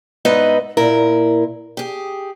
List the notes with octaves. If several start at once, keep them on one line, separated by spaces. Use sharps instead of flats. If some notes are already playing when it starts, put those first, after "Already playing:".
G#2 B3 D#4 B4 D#5 E5
A#2 E4 A#4
G4 G#4